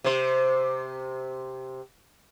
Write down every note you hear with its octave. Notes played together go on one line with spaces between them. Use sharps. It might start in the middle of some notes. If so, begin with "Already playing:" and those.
C3 C5